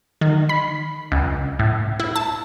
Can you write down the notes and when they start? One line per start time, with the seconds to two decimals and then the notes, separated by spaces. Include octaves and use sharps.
0.21 D#3
0.49 B5
1.12 C#2
1.59 A2
2.00 E4
2.16 A5